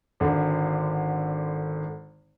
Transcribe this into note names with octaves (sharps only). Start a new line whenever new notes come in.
G#1 D3